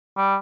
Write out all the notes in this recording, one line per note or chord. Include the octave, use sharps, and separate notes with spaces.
G3